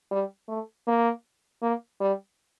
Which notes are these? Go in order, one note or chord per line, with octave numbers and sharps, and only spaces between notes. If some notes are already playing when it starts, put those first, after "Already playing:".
G3
A3
A#3
A#3
G3